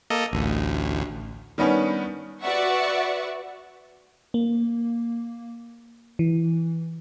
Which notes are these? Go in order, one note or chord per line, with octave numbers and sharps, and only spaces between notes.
A#3 A4 D#5
A1 D2
D#3 G3 B3 C#4 D4
F#4 B4 D5 E5 F#5 C#6
A#3
E3